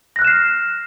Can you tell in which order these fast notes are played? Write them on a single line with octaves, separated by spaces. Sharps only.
A#6 F#6 F6 E7 C7